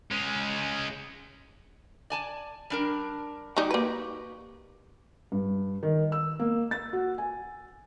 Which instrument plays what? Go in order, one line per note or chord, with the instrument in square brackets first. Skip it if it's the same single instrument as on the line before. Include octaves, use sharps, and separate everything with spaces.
[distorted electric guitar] G#3 C#4
[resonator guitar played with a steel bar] D5 G#5 A5
G3 D4 A#4
[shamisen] G3 D#4 [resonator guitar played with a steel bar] F#4 G4
[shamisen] A#3 B4
[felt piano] G2
D#3
E6
A#3
A6
F#4
G#5